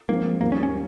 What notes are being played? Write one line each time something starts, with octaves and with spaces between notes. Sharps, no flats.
F3 G#3 A#3 C4
D#2 D#3 G3 A#3
C#4
C#4